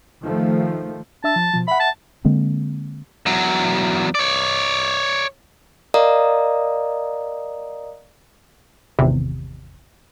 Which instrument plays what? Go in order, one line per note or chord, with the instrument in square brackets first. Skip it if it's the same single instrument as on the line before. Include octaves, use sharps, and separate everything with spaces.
[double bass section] D#3 F3 A3
[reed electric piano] D4 E5 E6 [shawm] A5
[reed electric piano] F3
B2 F3
[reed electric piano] E5 F#5 [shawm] B5
[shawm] A5
[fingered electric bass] D3 G#3 A#3 C4
[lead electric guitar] E2 F#3
C#5 D5
[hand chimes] A#4 D5 D#5 F5 A#5 D#6
[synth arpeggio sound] G#1 E2 C3